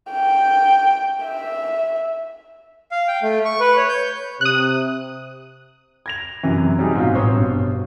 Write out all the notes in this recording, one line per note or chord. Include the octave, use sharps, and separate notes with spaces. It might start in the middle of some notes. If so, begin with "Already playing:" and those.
G5
E5
F5
G5
A3
C#6
B4
C#5
G6
C3 D#6 F#6
G#6 A#6 F7
F#2 C3 E3
C3 F#3 G3 D#4 G#4
G#2 B2 F4
A1 C4 C5 C#5 D#6
G2 B2